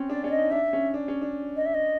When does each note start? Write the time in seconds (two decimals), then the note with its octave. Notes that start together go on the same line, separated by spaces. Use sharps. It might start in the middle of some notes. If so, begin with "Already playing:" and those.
Already playing: C4 C#4
0.10 D4 D5
0.24 C#4 D5
0.30 D#5
0.38 D#4
0.51 D4 E5
0.73 C#4
0.94 D4
1.08 C#4
1.22 D4
1.56 D#5
1.66 E5
1.74 D#5